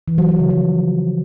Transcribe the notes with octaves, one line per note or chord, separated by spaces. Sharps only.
E3
F#3
F#3
C#3
F3